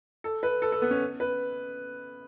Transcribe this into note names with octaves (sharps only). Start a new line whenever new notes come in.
A4
B4
A4
A4
B3
C#4
B4